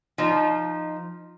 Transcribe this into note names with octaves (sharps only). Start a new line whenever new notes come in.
F3 D#4